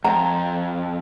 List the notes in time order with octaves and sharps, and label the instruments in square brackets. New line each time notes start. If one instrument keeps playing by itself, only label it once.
[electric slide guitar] F2 [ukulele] A#5